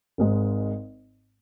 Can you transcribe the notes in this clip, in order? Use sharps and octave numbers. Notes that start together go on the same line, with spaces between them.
G#1 G#2 G#3